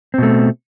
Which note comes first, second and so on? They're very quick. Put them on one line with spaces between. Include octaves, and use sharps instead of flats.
C4 B2 A3